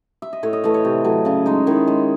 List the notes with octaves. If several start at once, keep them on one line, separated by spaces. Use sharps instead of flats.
E5
D#5
A2 C#5
D#5
E3 A3 D#5
C#5
C3 C5
F#3 A3
C#3 C#4
G#3 D#4
D#3 E4
G#3